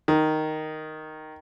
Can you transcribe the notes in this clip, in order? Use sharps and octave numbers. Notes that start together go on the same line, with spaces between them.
D#3